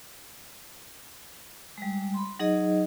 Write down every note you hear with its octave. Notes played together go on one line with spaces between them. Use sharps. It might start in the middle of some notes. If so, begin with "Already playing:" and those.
G3 G#3
B5 C6
F#3 D#4 G#4 D#5